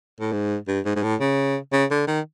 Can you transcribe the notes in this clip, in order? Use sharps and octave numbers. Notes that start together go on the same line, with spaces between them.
A2
G#2
G2
G#2
G#2
A2
C#3
C#3
D3
D#3